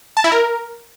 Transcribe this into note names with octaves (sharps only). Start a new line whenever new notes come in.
A5
E4
A#4